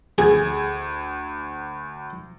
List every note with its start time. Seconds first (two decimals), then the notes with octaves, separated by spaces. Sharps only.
0.18 D2 G#4 G#6